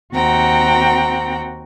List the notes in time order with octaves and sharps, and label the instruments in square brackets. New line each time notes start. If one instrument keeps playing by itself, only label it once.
[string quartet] D#2 C4 F#4 F#5 G5 A#5